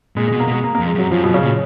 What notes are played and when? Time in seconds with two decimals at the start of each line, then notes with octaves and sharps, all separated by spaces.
0.16 A#2 G#3
0.28 G#3
0.32 B2
0.40 A#3
0.48 B2 G#3
0.64 A#3
0.75 A#3
0.79 F2
0.87 G#3
0.95 F#2 F#3
1.11 F#2 F3
1.24 F#2 B2
1.34 C#3
1.43 A#2